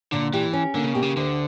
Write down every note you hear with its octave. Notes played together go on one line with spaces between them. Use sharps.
A#2 D3
E3 G4
C#4
D3 A#3
C#3
B2 G4
C#3
D2 D3